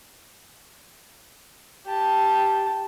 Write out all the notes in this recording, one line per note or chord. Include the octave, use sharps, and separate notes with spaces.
G4 A5